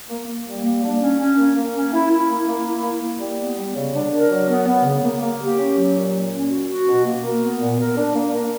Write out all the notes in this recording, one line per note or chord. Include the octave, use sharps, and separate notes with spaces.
A#3
A#3
G3
A#3
D4
C#4
C#4
A#3
A#3
C#4
E4
E4
A#3
A#3
E4
A#3
A#3
G3
B3
G3
C#3
D4
A#4
F#3
B3
B3
C#3
A#3
A#3
G4
C#4
F#3
A#2
A#3
C#4
F#4
F#4
B2
A#3
A#4
B3
A#2
A#4
D4
A#3
A#4